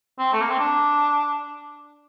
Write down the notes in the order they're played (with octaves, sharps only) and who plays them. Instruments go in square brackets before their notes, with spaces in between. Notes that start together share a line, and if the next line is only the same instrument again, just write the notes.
[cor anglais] C4
A3
A#3
C4
D4